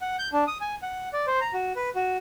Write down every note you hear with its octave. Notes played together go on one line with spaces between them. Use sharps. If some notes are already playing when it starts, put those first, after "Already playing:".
F#5
G6
D4
D#6
G#5
F#5
D5
C5
A#5
F#4
B4
F#4